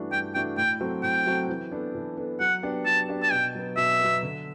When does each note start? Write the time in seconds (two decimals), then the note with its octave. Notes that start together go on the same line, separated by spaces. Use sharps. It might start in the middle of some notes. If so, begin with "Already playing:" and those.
Already playing: G2 E3 A3 D4 F#4
0.12 G2 G5
0.35 E3 A3 D4 F#4 G5
0.57 A2 G5
0.80 F#3 C4 F#4 A4
1.03 A2 G5
1.26 F#3 C4 F#4 A4
1.49 E3
1.71 B3 D4 A4
1.95 E3
2.17 B3 D4 A4
2.40 F#3 F#5
2.63 B3 D4 G4
2.86 F#3 A5
3.09 B3 D4 G4
3.23 A5
3.32 B2 G5
3.54 F#3 B3
3.77 B2 E5
4.00 F#3 B3
4.23 D3